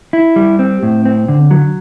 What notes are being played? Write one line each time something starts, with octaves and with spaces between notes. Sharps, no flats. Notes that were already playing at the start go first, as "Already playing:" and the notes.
E4
G3
C4
A2
C4
D3
F#3